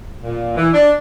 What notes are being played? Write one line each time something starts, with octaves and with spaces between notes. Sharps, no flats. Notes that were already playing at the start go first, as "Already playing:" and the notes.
A#2
E3
D4